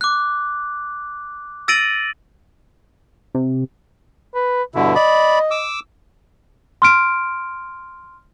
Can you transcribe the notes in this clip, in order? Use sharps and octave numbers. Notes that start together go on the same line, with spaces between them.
D6 F#6
E6 A6 A#6 D7 D#7 F#7
C3
B4
G2 B2 D3 E4
D5 D#5 B5
D6 E6
C6 F6 D7